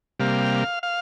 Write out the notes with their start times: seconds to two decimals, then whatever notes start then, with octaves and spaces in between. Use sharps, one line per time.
0.19 C3 G3 A#3 F5
0.83 F5